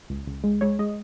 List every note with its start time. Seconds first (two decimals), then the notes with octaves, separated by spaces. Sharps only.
0.10 C#2
0.27 C#2
0.44 G#3
0.61 G#3 C#5
0.79 G#3 D#5